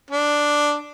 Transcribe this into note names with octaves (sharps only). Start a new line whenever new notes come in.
D4